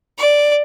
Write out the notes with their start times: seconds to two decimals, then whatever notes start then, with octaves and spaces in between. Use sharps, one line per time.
0.18 D5